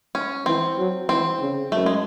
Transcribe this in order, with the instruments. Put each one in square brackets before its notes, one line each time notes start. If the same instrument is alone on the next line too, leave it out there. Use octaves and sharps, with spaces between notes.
[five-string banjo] C#4
[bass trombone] E3 [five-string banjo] C4
[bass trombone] F#3
[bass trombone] E3 [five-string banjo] C4
[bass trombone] C#3
[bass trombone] F#2 [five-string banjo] A3
[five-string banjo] G#3